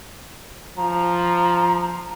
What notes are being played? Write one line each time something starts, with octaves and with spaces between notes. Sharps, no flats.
F3 A#5